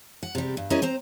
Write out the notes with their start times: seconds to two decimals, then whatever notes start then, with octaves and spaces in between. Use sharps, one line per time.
0.23 F#5
0.35 C3 G3
0.57 G2
0.70 G3 C#4 E4 A#4 D#5
0.82 C4 C5 A#5